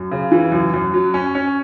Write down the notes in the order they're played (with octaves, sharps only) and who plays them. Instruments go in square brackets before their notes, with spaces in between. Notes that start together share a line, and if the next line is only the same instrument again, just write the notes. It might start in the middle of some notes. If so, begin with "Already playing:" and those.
Already playing: [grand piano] F#2
C#3
E3
F#2
F#2
F#3
C#4
C#4